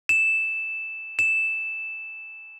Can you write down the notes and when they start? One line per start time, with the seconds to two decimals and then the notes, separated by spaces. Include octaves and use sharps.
0.09 E7
1.19 E7